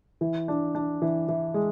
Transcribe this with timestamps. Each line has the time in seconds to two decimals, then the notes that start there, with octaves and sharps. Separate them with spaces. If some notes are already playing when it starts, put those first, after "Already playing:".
0.21 E3
0.48 D4
0.75 D4
1.02 E3
1.29 E3
1.54 G#3